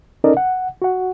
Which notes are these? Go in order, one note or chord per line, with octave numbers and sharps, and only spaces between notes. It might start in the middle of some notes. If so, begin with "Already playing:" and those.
C#4 D#4 A4 A#4 D5 D#5
F#5
F#4 F#5